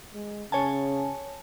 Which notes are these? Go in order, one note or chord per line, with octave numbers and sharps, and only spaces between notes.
G#3
C#3 C#5 G#5 A5